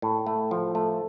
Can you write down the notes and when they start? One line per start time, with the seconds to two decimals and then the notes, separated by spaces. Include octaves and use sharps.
0.02 A2
0.27 A3
0.51 F3
0.75 A3